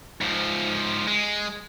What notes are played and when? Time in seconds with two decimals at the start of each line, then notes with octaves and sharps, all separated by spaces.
0.21 G#2 F3
1.07 G#3